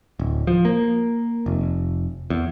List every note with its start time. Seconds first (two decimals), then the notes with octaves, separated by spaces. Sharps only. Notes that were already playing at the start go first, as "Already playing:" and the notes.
0.19 D1
0.47 F3
0.65 A#3
1.46 F1
2.30 E2